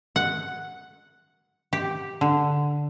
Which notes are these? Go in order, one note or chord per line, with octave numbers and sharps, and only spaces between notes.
F#5
G4
D3